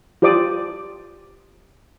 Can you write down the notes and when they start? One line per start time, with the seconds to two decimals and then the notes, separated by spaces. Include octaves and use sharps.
0.22 F4 G4 C5 D5 D6 D#6